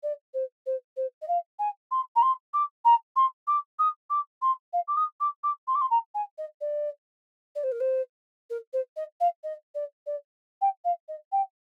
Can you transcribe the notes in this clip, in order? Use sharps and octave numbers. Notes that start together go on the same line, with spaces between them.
D5
C5
C5
C5
D#5
F5
G#5
C6
A#5
C6
D6
A#5
C6
D6
D#6
D6
C6
F5
D6
D#6
D6
D6
C6
D6
C6
A#5
G#5
D#5
D5
D5
C5
A#4
C5
A#4
C5
D#5
F5
D#5
D5
D5
G5
F5
D#5
G5